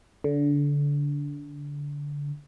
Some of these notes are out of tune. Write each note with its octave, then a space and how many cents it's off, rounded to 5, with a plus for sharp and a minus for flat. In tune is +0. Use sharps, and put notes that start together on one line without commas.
D3 -25